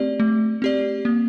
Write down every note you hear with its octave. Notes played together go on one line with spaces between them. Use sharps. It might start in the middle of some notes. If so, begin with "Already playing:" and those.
Already playing: A3 C4 G4 D5
A3
C4 G4 D5
A#3